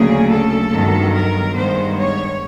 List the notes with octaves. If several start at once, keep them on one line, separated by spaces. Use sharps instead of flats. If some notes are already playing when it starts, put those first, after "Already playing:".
Already playing: D2 C#3 F#3 A#3 G#4
A4
G2 D#3 F#3 B3
A#4
G2 D#3 G#3 B3 C5
C#5